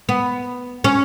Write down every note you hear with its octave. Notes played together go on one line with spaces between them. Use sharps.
B3
C#4